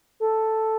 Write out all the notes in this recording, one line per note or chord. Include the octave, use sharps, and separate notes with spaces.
A4